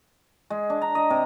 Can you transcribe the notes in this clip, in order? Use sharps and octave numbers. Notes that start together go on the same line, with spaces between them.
G#3
D4
A#5
D#5
C3